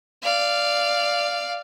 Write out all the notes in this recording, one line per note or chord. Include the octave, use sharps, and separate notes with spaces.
D5 F5